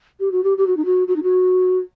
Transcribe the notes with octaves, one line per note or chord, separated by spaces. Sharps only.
G4
F#4
G4
G4
F#4
D#4
F#4
F#4
D#4
F#4